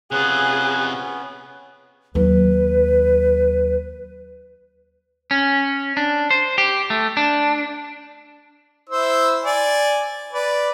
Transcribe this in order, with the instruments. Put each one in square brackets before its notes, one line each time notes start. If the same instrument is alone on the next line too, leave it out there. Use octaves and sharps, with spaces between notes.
[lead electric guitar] C3 F4 [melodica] B3 C#4 [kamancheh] G#4 [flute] F#6
[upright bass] D#2 F#3 [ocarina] B4
[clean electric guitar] C#4
D4
C5
G4
A3
D4
[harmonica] E4 C5 E6
D5 G#5
B4 D5